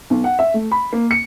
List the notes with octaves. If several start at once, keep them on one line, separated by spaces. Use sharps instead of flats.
B1
F#5
E5
A3
B5
A#3
C#7